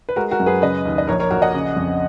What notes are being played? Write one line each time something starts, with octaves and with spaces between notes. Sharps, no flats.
B4
G#3 F#4 A#4
F#4 A#4
F#2
G#4 B4
C#3 B4 D#5
D#2
D#5
A#1 A#4 C#5
A#4 C#5
A#1 F#4 A#4
D#5 F#5
C#3
F2